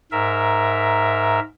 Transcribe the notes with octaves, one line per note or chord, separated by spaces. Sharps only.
G#2 A#4 E5